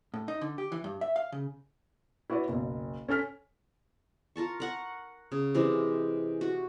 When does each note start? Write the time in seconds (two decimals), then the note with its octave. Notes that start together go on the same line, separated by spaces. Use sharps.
0.14 A2
0.28 D#4
0.41 D3
0.58 G4
0.72 E3
0.84 G2
1.01 E5
1.16 F5
1.32 C#3
2.30 E4 F#4 B4 C#5 D5
2.48 F#1 B1
3.08 C#4 A4 G#5 F6 B6
4.36 F4 A#4 A5 C#6
4.60 A#4 F#5 C#6
5.32 C#3
5.54 C3 E3 G#3
6.41 F#4